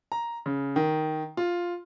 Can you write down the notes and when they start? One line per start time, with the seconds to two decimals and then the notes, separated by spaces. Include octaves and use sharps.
0.12 A#5
0.46 C#3
0.76 D#3
1.37 F4